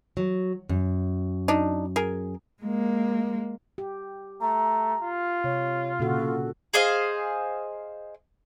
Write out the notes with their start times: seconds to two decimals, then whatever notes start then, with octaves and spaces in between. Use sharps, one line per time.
0.17 F#3
0.69 F#2
1.48 D4 D#4
1.96 G#4 A#4
2.62 G#3 A#3
3.78 G4
4.41 A3 A#5
5.02 F4
5.44 C3 C#5
5.99 A#2 C#3 F#4 A4
6.74 G#4 C5 D#5 F5